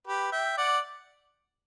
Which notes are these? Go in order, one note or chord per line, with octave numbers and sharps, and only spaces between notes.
G4 B4
E5 G5
D5 F#5